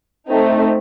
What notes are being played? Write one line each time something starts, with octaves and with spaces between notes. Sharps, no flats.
A3 C4 D#4